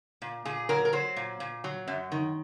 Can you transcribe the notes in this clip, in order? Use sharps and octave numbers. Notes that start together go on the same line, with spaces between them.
A#2
A#2 G#4
F#3 A#4
A#4
F#3 C5
A#2
A#2
F#3
F#2
D#3